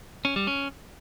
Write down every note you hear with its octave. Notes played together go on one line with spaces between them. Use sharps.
C#4
G3
C#4